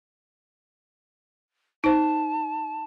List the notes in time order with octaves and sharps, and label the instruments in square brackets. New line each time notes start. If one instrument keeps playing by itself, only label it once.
[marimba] D#4 C5 [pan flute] A5